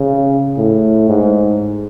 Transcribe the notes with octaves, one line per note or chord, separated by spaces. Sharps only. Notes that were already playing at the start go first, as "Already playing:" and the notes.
Already playing: C#3
A2
G#2